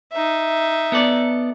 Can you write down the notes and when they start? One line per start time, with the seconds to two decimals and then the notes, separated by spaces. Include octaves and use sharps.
0.12 D#4 E5
0.92 B3 A4 D5